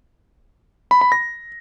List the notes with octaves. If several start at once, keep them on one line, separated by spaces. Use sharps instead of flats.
B5
B5
A#6